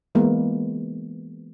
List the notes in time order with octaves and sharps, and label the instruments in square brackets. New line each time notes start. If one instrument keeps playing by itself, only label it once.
[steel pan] E3 G#3 A#3 B3